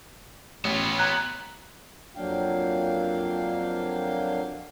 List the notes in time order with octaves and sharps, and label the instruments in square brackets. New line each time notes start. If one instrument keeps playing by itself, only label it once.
[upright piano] A1 [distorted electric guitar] B3 F4
[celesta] A#5 F#6 G#6
[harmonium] F2 F#3 A#3 D4 F5 G5